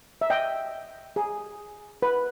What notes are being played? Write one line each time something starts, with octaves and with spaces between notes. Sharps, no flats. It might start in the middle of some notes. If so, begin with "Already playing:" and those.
E5
D#5 G5
G#4
B4